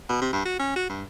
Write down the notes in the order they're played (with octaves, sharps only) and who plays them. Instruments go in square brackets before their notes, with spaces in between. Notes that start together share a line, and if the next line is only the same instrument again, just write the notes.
[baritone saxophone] B2
C3
G2
F#4
C#4
F#4
G2